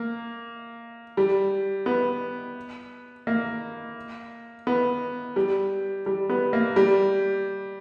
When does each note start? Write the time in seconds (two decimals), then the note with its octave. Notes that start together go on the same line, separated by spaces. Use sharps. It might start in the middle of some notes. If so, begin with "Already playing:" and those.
Already playing: A#3
1.17 G3
1.86 B3
3.27 A#3
4.67 B3
5.36 G3
6.06 G3
6.29 B3
6.53 A#3
6.76 G3